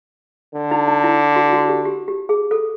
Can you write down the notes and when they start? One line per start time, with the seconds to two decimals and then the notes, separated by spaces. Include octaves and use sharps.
0.55 D3
0.71 D#4
0.88 D#4
1.04 E4
1.36 F#4
1.53 F#4
1.69 G4
1.85 G4
2.08 G4
2.29 G#4
2.51 A4